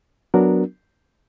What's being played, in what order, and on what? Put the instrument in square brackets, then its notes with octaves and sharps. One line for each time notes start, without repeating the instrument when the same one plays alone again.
[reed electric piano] F#3 B3 D4 F#4 A#4